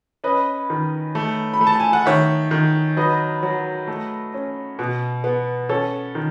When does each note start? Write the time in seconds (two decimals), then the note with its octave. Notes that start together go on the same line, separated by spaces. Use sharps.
0.24 C#4 B4 D#5
0.70 D#3
1.15 A3
1.54 B5
1.61 A3
1.67 A5
1.80 G#5
1.93 F#5
2.06 D#3 C#5 E5
2.51 D#3
2.97 F#3 B4 D#5
3.43 F#3
3.87 A3
4.34 C#4
4.79 B2
5.24 B3
5.69 C#4 A4 C#5
6.15 D#3